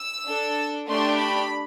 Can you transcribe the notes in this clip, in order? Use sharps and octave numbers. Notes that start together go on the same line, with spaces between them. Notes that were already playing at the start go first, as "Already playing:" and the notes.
Already playing: E6
D4 A4
A3 D4 G4 C6
B5